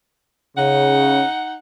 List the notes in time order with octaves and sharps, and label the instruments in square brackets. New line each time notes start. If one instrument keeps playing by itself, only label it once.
[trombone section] C#3 [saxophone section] D#4 F#5